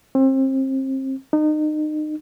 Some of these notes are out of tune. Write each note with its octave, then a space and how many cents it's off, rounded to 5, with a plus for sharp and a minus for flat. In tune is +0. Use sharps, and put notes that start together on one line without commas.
C4 +30
D#4 -30